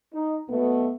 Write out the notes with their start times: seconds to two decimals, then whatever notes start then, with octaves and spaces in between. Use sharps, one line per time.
0.14 D#4
0.50 B1 B2 A3 B3